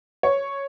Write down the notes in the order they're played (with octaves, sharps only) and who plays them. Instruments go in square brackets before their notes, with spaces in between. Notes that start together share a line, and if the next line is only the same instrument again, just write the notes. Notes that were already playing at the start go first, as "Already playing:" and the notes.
[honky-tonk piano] C#5